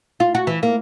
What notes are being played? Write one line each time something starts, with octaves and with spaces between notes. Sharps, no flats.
F4
F#4
E3
A#3